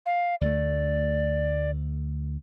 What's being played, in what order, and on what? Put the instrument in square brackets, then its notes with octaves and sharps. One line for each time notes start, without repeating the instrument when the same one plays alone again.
[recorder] F5
[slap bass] D2 A3 [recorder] D5